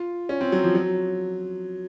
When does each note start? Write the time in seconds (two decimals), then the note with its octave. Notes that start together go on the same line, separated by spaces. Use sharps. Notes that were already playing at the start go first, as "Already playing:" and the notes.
Already playing: F4
0.29 C#4
0.41 C4
0.52 F#3
0.63 F3
0.75 F#3